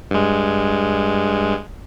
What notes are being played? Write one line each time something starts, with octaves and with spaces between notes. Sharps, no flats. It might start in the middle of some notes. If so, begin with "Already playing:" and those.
G2 G#3